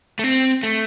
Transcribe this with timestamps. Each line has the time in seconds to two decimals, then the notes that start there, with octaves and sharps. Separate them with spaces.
0.19 A3
0.24 C4
0.63 A3